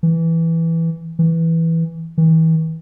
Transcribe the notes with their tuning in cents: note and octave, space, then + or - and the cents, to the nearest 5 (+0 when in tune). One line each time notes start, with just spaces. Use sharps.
E3 +0
E3 -5
E3 -35